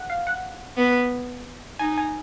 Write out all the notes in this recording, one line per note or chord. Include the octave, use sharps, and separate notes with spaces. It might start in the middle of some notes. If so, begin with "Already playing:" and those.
Already playing: F#5
F5
F#5
B3
D#4 G#5
G#5